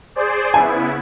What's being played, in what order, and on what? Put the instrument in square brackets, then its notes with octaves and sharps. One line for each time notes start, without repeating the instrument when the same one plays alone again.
[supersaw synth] G#4 C5 D5
[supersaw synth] C#3 B3 E4 [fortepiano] G#5